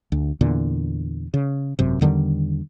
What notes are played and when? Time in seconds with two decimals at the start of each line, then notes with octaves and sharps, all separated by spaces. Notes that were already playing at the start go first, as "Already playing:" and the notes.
0.12 D2
0.41 E2 A#2 D3
1.34 C#3
1.79 G#1 F#2 C3
2.01 E2 D3 D#3 G3